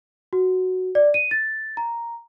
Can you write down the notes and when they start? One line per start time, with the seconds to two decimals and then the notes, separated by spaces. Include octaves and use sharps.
0.33 F#4
0.95 D5
1.14 D#7
1.31 A6
1.77 A#5